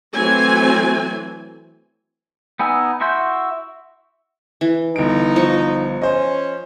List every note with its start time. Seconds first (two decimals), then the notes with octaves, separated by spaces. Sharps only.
0.13 E3 F#3 A3 C4 G#5
2.60 B3 D#4 G#5 E6
3.00 E4 F#4 E5 C6 G6
4.61 E3
4.96 G1 D#4 D7
5.36 F3 C#6
6.02 C#4 C5 D#5